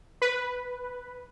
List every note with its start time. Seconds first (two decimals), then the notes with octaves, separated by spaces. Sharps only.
0.22 B4